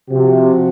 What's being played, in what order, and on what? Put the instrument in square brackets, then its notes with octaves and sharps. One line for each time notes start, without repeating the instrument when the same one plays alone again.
[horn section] C3 [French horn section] F3 C4 F#4